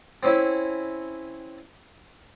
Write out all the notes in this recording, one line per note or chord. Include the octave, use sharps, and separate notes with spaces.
C4 C#4 E4